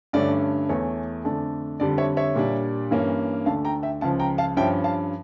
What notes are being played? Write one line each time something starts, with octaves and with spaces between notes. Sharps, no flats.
G2 D3 A3 C#4 D5
E2 E3 A3 C#5
F2 D3 A3 D4
F2 D3 G3 D5
C#5 E5
C#5 E5
A#2 G3 D4
G2 E3 A#3 C#4
D2 D3 A3 D4 F5 A5
G5 A#5
E5 G5
C#2 C#3 F3 F5 A5
G5 A#5
F5 A5
G2 F3 C#4 E5 G5
F5 A5